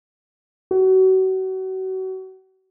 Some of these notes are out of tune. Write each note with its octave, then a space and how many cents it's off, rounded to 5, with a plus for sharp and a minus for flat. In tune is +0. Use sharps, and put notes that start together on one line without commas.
F#4 +30